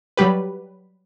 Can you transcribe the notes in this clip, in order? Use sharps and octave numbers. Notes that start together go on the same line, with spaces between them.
F#3 G3 G4 B4